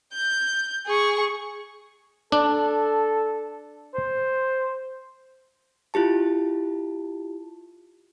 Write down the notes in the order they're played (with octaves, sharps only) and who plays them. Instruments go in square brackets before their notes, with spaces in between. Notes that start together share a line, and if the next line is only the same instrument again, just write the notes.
[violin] G6
G#4 C#6
[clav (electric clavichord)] D4 [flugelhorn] A4
[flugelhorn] C5
[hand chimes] E4 F4 G4 A5